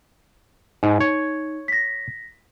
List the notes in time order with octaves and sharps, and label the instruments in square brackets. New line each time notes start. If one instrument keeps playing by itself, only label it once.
[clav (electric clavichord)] G#2 [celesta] D#4
[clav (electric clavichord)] C#5
[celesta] A#6 B6